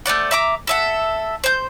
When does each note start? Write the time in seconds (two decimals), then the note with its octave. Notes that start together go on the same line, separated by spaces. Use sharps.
0.06 A3 C5 D5 F#5
0.31 E5 A#5 D6
0.67 A4 E5 F#5
1.44 C5 G6